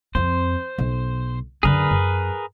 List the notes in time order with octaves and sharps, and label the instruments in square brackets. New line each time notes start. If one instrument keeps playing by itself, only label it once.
[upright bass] F2 C4 [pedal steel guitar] C5
[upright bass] B1
[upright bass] F#2 D3 [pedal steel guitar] G#4 A#4 B4
[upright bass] F#2